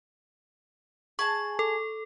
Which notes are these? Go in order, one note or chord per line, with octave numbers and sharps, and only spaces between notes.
G#4 A5 C#6
A4